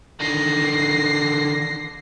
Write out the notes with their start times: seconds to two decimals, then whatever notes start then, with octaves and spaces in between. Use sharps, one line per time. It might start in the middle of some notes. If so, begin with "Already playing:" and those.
0.20 D3 D#3 A#6 C7